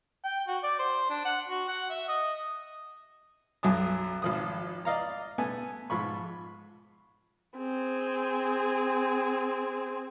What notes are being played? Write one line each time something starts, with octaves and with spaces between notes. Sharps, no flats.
G5
F#4
D5
C5
D4
F#5
F#4
F#5
E5
D#5
B1 F#2 F#3 G#5 A5 D#6
G#1 F3 D#6
D5 D#5 F5 A#5
A3 B3 G#5
G#2 F3 B5 C#6
C4 G#4